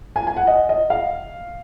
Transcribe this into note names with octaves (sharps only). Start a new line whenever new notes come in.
G#5
G#5
F#5
D#5
D#5
F5